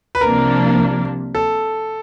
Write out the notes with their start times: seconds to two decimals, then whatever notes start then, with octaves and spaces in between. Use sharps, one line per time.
0.15 B4
0.21 C2 C3 F3 A#3 D4 A#4
1.35 A4